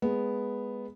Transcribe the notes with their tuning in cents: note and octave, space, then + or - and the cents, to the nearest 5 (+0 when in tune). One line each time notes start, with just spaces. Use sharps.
G#3 +0 B3 +0